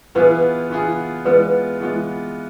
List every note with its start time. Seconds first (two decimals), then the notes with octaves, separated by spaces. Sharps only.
0.15 E3 B3 F4 G#4 B4
0.70 E3 B3 F4 G#4
1.25 E3 G#3 B3 F4 B4 D5
1.80 E3 G#3 B3 F4